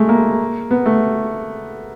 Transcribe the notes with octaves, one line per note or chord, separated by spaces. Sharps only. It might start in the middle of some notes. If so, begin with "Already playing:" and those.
Already playing: G#3 A3
A#3
B3
A3